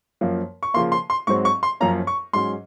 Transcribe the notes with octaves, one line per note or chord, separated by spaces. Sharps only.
F#2 F3 A#3
C#6
C#3 F3 A#3 C6
C6
C6
G#2 F#3 C4 C#6
C#6
C6
F#2 F3 A#3 C#4 A#5
C#6
G#2 F#3 C#4 C6